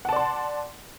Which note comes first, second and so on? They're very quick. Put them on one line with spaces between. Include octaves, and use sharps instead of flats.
F#5 A5 D5 C6